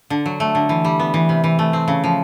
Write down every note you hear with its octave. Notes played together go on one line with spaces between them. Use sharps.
D3
F#3
A3
D3
E3
G3
B3
E3
C3
E3
A3
C4
C#3
F3